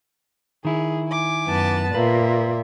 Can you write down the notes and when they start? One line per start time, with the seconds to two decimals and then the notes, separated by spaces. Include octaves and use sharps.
0.65 D#3 E4 G#4
1.08 G#5 D6
1.46 F#2 B3 A5
1.95 A#2 A#3 B4 E5